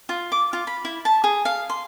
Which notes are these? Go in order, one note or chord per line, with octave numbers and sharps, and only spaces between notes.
F4
D6
F4
B5
E4
A5
G#4
F5
C6